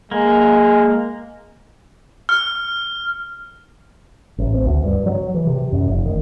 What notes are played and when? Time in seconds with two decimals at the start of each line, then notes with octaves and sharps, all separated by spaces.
0.11 G#3 A#3
2.29 F6
4.38 A1
4.54 C4
4.66 D2
4.84 G2
5.06 F#3
5.34 E3
5.47 C3
5.72 F#2
5.88 F1
6.05 D#3